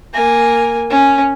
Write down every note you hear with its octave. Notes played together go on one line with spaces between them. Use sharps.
A#3 G#5
C#4